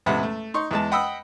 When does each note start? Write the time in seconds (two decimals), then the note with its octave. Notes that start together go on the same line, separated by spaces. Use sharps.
0.06 A1 E2 C3 G#3 F#5 B5
0.23 A3
0.54 D#4 C6 C#6
0.71 E2 G#3 A5
0.91 D#5 F#5 G5 B5 D#6 E6